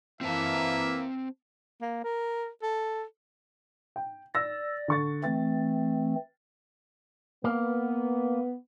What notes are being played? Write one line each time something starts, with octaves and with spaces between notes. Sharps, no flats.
E3 A#3 C4 C5 E5 A5
A#3
A#4
A4
G5
D5 E6 A#6
D3 C#6 A6
E3 A3 C4 A6
A#3 B3